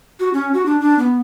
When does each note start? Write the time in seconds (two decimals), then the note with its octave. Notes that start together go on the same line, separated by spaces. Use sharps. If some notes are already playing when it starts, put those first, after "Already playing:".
0.20 F#4
0.33 C#4
0.54 F#4
0.66 D4
0.80 D4
0.99 B3